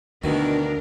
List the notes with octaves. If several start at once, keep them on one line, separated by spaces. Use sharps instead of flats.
D2 B2 D#3 D4 A#4